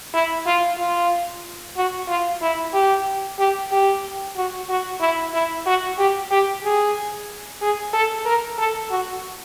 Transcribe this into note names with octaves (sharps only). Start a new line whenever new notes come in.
E4
F4
F4
F#4
F4
E4
G4
G4
G4
F#4
F#4
E4
E4
F#4
G4
G4
G#4
G#4
A4
A#4
A4
F#4